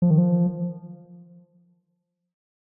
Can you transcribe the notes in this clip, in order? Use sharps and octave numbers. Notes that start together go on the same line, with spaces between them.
F3
D#3
F3